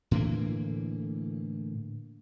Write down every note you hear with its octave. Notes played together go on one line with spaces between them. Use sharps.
A2 D3 E3 A#3